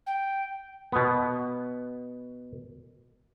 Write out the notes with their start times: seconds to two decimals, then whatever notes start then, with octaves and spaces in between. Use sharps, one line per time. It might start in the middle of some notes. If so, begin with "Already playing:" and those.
0.06 G5
0.92 B2 B3